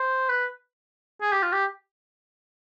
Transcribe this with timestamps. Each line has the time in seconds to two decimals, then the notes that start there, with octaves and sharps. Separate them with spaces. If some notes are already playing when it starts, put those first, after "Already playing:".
Already playing: C5
0.29 B4
1.22 G#4
1.32 G4
1.42 F4
1.52 G4